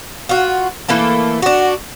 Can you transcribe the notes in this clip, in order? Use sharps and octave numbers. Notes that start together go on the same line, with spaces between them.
F4 F#4
E3 A3 A#3 A4
D4 F#4